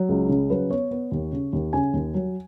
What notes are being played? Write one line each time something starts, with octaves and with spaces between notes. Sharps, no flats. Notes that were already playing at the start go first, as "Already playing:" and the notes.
Already playing: F#3
C#2
C#3
F#3 B4
B3 C#5
B3
D#2
C#3
D#2
C#3 G#5
D#2
F#3